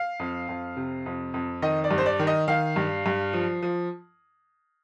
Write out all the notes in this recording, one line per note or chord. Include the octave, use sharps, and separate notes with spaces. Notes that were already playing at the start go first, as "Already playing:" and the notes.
Already playing: F5
F2
F2
C3
F2
F2
D#3 D#5
D5
G2
C5
D5
D#3
D#5
D#3 F5
G2
G2
F3
F3